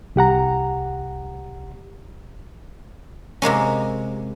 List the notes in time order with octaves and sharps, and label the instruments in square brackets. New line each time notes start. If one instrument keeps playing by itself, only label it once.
[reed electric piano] C2 G4 F#5 A#5
[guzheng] C3 G#3 A#3 C#4